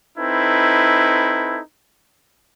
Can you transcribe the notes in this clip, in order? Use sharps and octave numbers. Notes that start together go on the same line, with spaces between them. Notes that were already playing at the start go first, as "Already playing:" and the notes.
C4 D#4 E4 A4 B4